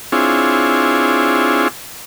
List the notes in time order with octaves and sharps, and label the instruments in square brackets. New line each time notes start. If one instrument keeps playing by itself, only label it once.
[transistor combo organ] C4 D4 E4 F4 G#4 C#5